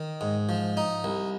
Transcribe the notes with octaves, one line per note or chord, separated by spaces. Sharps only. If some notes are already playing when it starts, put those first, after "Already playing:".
Already playing: D#3
G#2
F3
D#4
C2